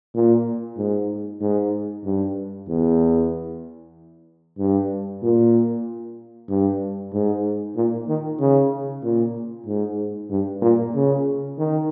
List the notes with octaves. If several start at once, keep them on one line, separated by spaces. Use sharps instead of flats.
A#2
G#2
G#2
G2
E2
G2
A#2
G2
G#2
A#2
D#3
C#3
A#2
G#2
G2
A#2
C#3
D#3